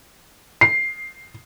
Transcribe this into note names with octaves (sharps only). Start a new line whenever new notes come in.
C7